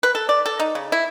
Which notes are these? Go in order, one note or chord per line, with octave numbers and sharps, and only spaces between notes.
B4
A4
D5
A4
D#4
C#3
E4